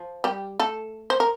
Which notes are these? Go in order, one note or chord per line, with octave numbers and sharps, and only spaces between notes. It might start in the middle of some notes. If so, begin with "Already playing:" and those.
Already playing: F3
G3 G4
A3 A4
C5
A#4